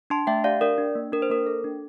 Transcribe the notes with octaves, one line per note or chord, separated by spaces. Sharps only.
D4 A5 C6
A3 E5 G5
G4 D5 F5
D4 A#4 D5
D4
A#3
D4 A#4
C5
A#3 A#4
A4
D4